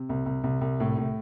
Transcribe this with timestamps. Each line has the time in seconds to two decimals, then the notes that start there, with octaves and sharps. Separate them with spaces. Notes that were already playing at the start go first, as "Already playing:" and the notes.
Already playing: C3
0.09 C2
0.26 C2
0.44 C2
0.61 C2
0.80 A2
0.98 A2